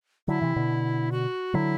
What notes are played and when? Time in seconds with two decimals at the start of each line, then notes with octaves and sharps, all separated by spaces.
0.28 D3 F#3 E4
0.42 C3 E3
0.56 B2 D3
1.12 F#4
1.54 D3 F#3 E4